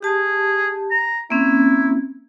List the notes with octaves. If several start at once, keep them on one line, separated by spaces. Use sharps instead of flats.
G4 G#4 A5
A#5
A#3 C4 C#4 E4